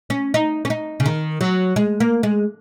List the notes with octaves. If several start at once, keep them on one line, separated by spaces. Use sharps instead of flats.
C#4
D#4
C#4
D#4
C#3
D#3
F#3
G#3
A#3
G#3